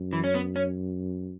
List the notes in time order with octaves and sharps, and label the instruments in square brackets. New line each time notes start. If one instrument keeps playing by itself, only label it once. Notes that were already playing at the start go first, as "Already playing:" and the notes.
Already playing: [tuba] F#2
[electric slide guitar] E3
C#4
B3
C#4